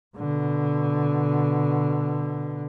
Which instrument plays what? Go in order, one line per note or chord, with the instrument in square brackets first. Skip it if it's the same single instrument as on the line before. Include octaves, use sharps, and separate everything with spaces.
[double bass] B2 D3